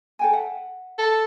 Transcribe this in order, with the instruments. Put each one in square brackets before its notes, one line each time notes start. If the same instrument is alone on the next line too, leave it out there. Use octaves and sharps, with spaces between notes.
[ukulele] A4 G5 G#5
E5 F#5
[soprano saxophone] A4